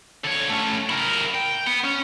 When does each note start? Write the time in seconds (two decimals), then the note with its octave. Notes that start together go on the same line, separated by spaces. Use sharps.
0.24 D3 C#5
0.49 A3 C#4
0.89 E4 A#4
1.35 G5
1.67 B3
1.84 C#4